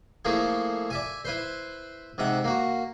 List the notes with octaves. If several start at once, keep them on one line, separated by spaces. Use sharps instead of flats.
F3 A3 A#3 E4 G#4
D5 E5 G#5
E4 B4 C5
G#2 C3 E5 F#5
A#3 F#4